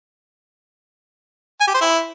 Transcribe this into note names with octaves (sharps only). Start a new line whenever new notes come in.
G#5
G4
C5
E4